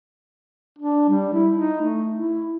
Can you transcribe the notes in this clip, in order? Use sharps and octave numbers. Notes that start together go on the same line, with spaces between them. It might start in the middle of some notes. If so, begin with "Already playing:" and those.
D4
G3
E4
D#4
A3
E4